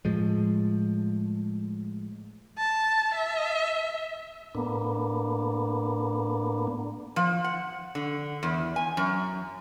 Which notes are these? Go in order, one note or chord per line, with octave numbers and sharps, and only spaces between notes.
A2 F3 G#3
A5
E5
A2 A#3 B3 D4
F3
F#5
D3
E2
G#5
F#2